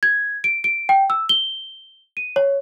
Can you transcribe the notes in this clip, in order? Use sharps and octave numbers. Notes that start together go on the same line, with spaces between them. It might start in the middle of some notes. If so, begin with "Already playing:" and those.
G#6
D7
D7
G5
E6
G7
D#7
C#5